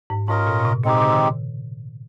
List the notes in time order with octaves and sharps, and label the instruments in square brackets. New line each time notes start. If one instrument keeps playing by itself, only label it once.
[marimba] G#2
[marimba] G#2 [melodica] C#4 F4 A#4 D#5
[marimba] A#2
A#2
C3
[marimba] A#2 [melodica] G#3 C4 D#4 G4
[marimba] C#3
D#3